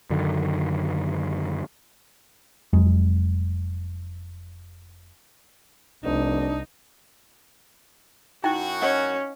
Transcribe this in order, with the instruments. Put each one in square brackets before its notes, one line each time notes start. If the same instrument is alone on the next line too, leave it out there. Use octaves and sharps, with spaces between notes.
[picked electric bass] F#2 D3 D#3
F1 F2 F#3 G#3
[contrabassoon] F1 [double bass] C2 [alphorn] D4 [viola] D#4
[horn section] F#2 F#4 [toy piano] D#4 E4 G5
[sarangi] C#4 [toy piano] D#5 F#5